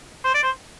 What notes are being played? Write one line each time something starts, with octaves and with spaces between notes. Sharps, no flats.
C5
D5
C5